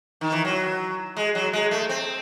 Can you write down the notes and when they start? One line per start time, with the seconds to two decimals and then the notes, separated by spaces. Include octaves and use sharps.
0.21 D#3
0.32 E3
0.45 F#3
1.16 G#3
1.35 F#3
1.53 G#3
1.71 A3
1.89 C4